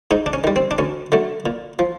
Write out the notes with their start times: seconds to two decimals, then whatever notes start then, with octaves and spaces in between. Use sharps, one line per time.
0.11 G#2 D#4
0.26 D4
0.33 C#4
0.44 D#3 G3
0.56 C4
0.71 D4
0.78 D2 C#4
1.12 D3 F#3 A3
1.46 A#2
1.79 F3